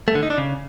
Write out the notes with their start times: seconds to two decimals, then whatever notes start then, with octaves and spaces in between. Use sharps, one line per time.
0.08 A3
0.15 D3
0.23 D#4
0.30 D4
0.38 C#3